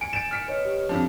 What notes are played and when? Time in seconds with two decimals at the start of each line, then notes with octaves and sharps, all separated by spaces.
0.01 G#5 C#7 D7
0.13 G#5 G6 A6 D7 E7
0.31 F6 B6 C#7
0.48 B4 C#5 D#5
0.65 G4
0.89 F2 D3 F3